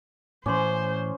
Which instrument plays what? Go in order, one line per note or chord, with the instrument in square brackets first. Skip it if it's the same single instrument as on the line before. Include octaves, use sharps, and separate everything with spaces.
[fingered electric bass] A2 E3 [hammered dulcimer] C#4 [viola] C5 [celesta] C6 D6